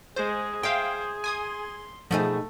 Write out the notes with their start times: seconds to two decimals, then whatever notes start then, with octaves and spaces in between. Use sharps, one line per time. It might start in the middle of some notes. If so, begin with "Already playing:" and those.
0.16 G#3 G#4 C5
0.63 C5 E5 F5 G5
1.24 G#5 C6 D#6 G#6
2.11 B2 F3 A3 D#4 G#4